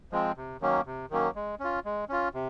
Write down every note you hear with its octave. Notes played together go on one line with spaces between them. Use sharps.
F3 G#3 C4
C3
D#3 F#3 A#3 C#4
C3
D#3 F#3 A#3 C#4
G#3
C#4 F4
G#3
C#4 F4
C3